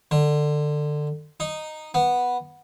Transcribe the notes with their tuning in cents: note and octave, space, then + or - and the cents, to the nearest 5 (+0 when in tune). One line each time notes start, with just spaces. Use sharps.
D3 +20
D#4 -10
B3 -5